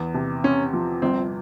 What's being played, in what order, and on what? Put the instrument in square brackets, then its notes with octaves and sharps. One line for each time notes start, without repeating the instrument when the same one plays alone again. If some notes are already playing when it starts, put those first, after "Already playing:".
Already playing: [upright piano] E2
C3
[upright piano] C4 [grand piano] C#4
[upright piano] F3
[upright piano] G1 [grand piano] C4